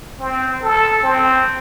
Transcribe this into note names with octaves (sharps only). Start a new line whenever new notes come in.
C4
A4
C4